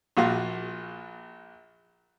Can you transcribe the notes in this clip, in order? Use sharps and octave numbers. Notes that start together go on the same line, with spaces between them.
A#1 A#2 F#4 F5